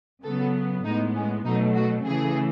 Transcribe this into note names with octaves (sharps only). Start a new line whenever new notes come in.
C#3 F#3 B3 A4
A2 G#3 B3 D#4
C#4
B2 F#3 A3 D#4
F#4
C#3 E3 A3 G#4